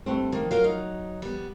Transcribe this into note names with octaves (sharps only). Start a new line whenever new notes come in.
G2 A3 C4
D#3 F3 A#3
F#3 F4 A#4 F5
D#4
G3 B3